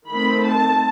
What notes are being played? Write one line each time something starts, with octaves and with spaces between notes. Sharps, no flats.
D#3 A3 C4 B5
A5